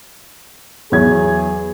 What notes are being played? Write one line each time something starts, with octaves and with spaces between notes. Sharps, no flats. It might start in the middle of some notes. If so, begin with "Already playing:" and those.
E2 F#3 G#4 G#6